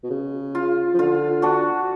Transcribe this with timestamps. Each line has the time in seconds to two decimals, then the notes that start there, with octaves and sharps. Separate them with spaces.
0.03 B2
0.10 C#3
0.55 F4
0.94 F3
0.99 D3 F4
1.42 D4 F#4